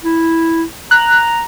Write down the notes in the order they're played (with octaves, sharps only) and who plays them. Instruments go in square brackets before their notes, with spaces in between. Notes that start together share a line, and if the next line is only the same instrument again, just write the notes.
[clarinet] E4
[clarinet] A#5 [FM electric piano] F#6